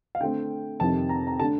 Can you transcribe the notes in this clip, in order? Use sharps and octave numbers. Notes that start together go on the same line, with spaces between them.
F5
D3 A3 C4 G5
F2 C3 D#3 A5
A#5
A#5
D3 A3 D4 A5